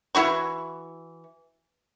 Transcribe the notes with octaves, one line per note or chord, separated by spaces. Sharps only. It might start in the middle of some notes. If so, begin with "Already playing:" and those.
E3 E4 F#4 C#6